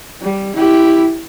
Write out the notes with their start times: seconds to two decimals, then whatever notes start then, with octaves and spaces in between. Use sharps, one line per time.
0.22 G3
0.56 E4 G4